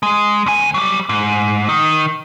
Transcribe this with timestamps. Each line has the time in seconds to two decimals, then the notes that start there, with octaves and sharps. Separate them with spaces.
0.03 G#3
0.46 D2 G#5
0.74 F#3 G3
1.09 G#2
1.69 D#3